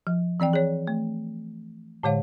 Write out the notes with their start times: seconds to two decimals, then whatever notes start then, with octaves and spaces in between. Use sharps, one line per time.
0.07 F3
0.40 E3 C4 D5 G5
0.53 G#4 C#5
0.87 A3
2.03 A2 D3 G#3 C#5 F5